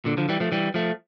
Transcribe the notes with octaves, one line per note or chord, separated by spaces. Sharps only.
A#2 D3
D3 F3
E3 G3
F3 A3
E3 G3
F3 A3